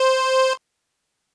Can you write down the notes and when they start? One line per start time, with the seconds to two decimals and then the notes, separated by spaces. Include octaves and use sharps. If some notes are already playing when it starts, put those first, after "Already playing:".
Already playing: C5